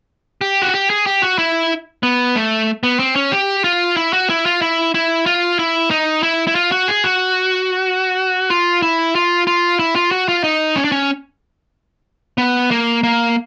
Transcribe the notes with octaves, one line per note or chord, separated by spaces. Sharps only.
G4
F#4
G4
G#4
G4
F#4
E4
B3
A3
B3
C4
C#4
G4
F4
E4
F#4
E4
F4
E4
E4
F4
E4
D#4
E4
E4
F4
F#4
G#4
F#4
F4
E4
F4
F4
E4
F4
F#4
F4
D#4
C#4
D4
C#4
B3
A#3
A#3